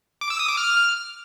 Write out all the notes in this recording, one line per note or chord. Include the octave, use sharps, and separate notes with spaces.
D6
E6
D#6
D6
F6